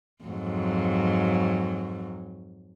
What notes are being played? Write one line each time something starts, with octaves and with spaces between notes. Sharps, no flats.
F2 G#2 F#3